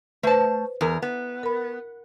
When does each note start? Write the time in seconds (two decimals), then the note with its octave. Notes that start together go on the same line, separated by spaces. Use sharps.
0.23 A3 B4 C5 A5
0.81 E2 A#4
1.02 B3
1.43 A#4 B5